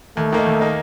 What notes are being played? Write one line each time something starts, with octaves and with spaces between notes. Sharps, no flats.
D#2 A3
D#3 A#3 D#4
D#2
D#3 A#3 D#4